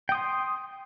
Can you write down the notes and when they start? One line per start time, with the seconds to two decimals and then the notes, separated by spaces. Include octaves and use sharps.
0.09 G5
0.12 D#6
0.15 C6